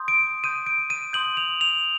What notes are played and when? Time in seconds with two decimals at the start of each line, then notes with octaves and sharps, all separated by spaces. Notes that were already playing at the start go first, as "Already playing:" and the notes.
Already playing: C6 D#6 G6
0.08 D7
0.44 C6 D#6 G6 D#7
0.66 D7
0.90 D#7
1.13 C6 D#6 G6 F#7
1.37 F7
1.61 F7